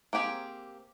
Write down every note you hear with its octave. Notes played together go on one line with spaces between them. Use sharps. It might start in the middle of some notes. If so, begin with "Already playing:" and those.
A#3 C4 G4 G#4